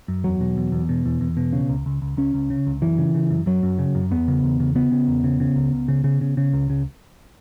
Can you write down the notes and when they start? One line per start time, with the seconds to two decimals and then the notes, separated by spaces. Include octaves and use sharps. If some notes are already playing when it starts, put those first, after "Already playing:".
0.08 F#2
0.24 E2 F#3
0.41 B2
0.57 E2
0.72 E2
0.89 B2
1.05 E2
1.21 E2
1.37 B2
1.53 C#3
1.69 C#2
1.86 C#2
2.02 C#2
2.17 C#2 C#4
2.34 C#2
2.50 C#3
2.67 C#2
2.82 F#2 E3
2.98 C#3
3.14 C#3
3.30 F#2
3.46 F#2 F#3
3.63 F#2
3.79 C#3
3.95 F#2
4.11 E2 B3
4.28 C#3
4.44 E2
4.60 C#3
4.75 C#3 B3
4.92 C#3
5.08 E2
5.24 C#3
5.40 C#3
5.56 C#2
5.73 C#2
5.88 C#3
6.04 C#3
6.21 C#3
6.37 C#3
6.53 C#2
6.70 C#3